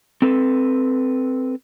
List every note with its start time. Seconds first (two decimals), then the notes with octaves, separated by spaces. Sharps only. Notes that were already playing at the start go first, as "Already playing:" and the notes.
0.22 C4 A4 B4